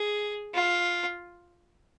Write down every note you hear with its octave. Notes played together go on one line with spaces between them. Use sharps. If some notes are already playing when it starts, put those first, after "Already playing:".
Already playing: G#4
F4